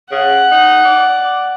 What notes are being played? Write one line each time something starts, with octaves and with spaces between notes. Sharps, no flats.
C#3 F#5
D#4
D5